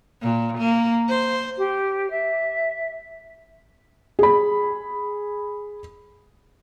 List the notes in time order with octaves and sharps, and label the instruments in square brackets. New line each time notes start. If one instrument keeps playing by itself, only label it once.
[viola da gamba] A#2
A#3
C5
[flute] G4
E5
[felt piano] G#4 B5